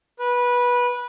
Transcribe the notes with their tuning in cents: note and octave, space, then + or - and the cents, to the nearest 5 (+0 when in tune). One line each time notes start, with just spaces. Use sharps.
B4 -15